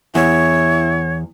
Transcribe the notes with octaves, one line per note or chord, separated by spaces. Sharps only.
E2 E4 C#5